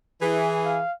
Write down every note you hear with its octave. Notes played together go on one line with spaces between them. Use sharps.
E3 G#4
F5